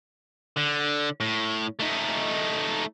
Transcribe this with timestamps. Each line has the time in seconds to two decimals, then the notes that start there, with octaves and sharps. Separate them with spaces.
0.57 D3
1.20 A2
1.80 A3 D#4